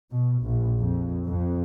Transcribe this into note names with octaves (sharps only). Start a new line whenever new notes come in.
B2
A#1
F2
F2